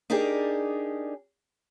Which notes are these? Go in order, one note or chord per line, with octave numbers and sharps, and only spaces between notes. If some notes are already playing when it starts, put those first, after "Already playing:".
D4 D#4 G4 G#4 A#4 D5